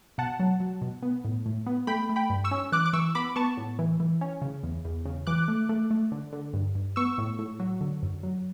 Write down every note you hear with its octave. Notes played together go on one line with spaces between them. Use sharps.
B2 F#5 A5
F#3
F#3
B2
B3
A2
A2
B3
A3 G5 B5
A3
G5 B5
G2
C#6 E6
C#4
E3 D6 F#6
D6
E3 C#6 E6
B3 B5 D6
B3 A5 C#6
A2
E3
E3
C#4
C#3
E2
E2
C#3
E3 D6 F#6
A3
A3
A3
D3
D3
G2
G2
B3 C#6 E6
A2
A2
F#3
D3
F#2
F#3